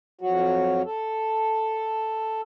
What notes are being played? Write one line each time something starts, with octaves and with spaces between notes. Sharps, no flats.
F2 F#3 F#4
A4